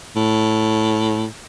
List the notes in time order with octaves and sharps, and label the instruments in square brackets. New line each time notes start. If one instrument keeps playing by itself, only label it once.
[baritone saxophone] A2